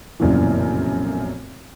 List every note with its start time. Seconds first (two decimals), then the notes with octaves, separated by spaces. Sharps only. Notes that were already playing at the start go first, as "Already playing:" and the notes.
0.20 F1 B1 F#2 A#2 C#3 E3